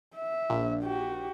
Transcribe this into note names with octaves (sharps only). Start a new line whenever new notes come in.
E5
A#1
F#4 G4